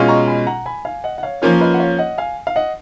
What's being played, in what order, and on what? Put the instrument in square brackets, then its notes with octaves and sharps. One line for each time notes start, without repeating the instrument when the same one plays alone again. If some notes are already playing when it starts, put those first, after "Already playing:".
Already playing: [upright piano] B2 G#3 C#4 F4
[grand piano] A#5 C#6
G#5 B5
F#5 A#5
G#5 B5
F5 G#5
D#5 F#5
F#5
C#5 F5
[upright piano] F3 A#3 C#4 F4 [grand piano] A#4 C#5
[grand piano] B4 D#5
F#5
C#5 F5
D#5 F#5
F5 G#5
F5
D#5 F#5